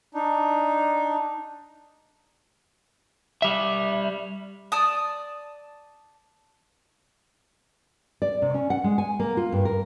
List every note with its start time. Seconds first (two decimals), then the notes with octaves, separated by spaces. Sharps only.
0.14 D4 D#4
3.42 G3 E5
4.72 D5 A5 D#6
8.22 D5
8.42 C3
8.54 C#4
8.70 F#5
8.84 G#3
8.98 G#5
9.20 A#3
9.37 F4
9.52 G2
9.65 A#4